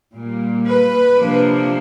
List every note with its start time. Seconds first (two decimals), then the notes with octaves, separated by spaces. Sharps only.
0.15 A#2 G3 A#3
0.67 B4
1.18 C3 F3 A#3 D4